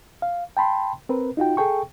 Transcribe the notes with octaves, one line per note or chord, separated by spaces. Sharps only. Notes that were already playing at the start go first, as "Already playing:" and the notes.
F5
G5 A5 B5 C6
C4 A#4 B4
D#4 F4 F#4 G5
G#4 A4 G5 C#6